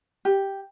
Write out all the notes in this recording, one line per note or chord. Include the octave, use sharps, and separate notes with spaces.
G4